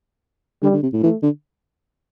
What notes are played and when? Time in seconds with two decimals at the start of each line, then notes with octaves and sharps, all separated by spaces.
0.63 D3 G3
0.73 D3
0.83 C3
0.94 A2
1.03 E3 A3
1.23 D3